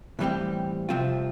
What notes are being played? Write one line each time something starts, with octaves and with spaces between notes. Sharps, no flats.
A2 E3 G3 C4 G4
C2 C3 F3 C4 F4